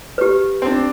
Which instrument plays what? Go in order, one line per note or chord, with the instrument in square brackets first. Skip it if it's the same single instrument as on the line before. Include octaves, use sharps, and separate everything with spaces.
[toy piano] G4 B4
[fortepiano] C4 D4